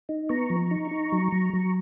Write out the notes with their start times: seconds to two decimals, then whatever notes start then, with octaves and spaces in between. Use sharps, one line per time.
0.09 D#4
0.29 B3 A#5 C#6
0.50 F3
0.71 D#4
0.91 D#4
1.12 F#3
1.32 F#3
1.54 F#3